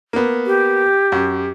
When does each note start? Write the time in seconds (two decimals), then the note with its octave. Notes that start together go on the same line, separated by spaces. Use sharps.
0.13 A#3 B3
0.46 G4
1.12 F#2